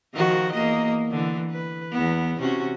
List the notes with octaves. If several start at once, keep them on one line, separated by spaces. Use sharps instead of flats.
D#3 F3 F#4
E2 A#3 D#5
D3 E3
B4
E2 B3
C3 C#4 F#4